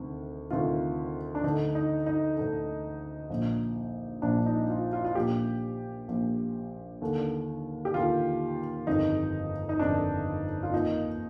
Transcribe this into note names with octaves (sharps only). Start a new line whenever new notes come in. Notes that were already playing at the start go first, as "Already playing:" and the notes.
Already playing: D2 C3 D#3
D2 C3 D#3 F4
D4
D2 D3 D#4
D#4
D#4
D2 D3
A#1 A#2
A#1 A#2 D4
D#4
F4
F4
F4
A#1 A#2 G4
A#1 A#2
D#2 D3
G4
D#2 D3 F4
G1 F2 D#3 D#4
D#4
G1 F2 D#3 D4
F4
D#2 D#3 D#4